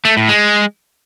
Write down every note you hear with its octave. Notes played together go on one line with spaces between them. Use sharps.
A3
A2
G#3